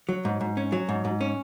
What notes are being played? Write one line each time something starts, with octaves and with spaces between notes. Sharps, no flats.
F#3
G#2
G#2
C#4
F#3
G#2
G#2
C#4